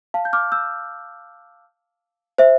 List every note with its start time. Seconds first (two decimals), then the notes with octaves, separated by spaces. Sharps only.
0.14 F5 A5
0.25 G6
0.33 D6 F6
0.52 E6 G6
2.38 C5 E5